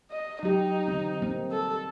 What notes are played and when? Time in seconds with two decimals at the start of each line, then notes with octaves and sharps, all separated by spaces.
0.12 D#5
0.43 F#3 D#4 G4
0.88 D3 E3 C4
1.22 G3 A#3 C4
1.51 A4